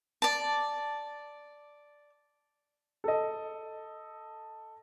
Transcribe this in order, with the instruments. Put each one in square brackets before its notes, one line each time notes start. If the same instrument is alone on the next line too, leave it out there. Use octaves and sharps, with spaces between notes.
[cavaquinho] D5 A5
[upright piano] A4 D#5